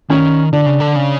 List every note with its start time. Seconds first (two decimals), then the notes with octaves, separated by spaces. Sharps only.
0.10 D#3 C#4
0.53 D3 D4
0.66 C#3
0.80 D3
0.96 C#3